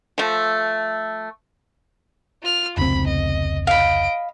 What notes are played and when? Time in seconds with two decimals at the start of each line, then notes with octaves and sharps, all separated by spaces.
0.18 F3 A3
2.43 F4 F6
2.77 F1 C#2 C4 B5
3.07 D#5
3.67 D#5 F5 B5 D7